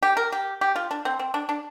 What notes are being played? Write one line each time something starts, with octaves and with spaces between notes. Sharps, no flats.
G4
A#4
G4
G4
F4
D4
C4
C4
D4
D4